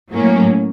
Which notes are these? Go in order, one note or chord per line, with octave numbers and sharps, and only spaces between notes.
A2 F#3 A#3 C#4